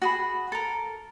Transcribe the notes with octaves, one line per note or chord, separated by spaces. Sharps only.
F#4 G#4 B5
A4 A#4